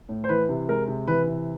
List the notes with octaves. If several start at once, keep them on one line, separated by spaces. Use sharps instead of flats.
A2
C5
E3 B4
C3
G#3 A#4
C3
E3 B4
C3